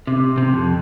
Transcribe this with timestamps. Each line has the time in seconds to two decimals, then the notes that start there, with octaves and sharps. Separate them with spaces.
0.07 C3
0.38 C3
0.53 F2